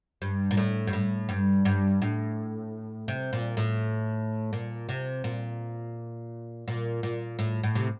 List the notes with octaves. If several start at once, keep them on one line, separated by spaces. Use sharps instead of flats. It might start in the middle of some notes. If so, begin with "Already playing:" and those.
G2
A#2
A2
G2
A2
G2
G2
A2
C3
A#2
A2
A#2
C3
A#2
A#2
A#2
A2
A2
C3